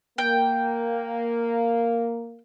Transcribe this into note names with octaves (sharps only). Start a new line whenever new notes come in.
A#3 G5